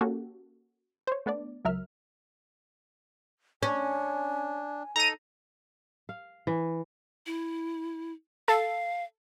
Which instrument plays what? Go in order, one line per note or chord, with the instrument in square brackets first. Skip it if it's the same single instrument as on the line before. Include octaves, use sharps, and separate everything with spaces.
[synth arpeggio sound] A#3 C#4 F#4 G4 A4
C5 C#5
A3 B3 D4 D5
C#2 F#3 A#4 E5 F6
[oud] C#4 [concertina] D4 [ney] G#5
[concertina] D#4 A4 [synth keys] A#5 D#7
[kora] F5
E3
[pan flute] E4
[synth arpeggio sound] A4 [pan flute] F5